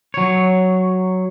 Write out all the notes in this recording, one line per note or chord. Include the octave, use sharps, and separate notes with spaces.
F#3 C#5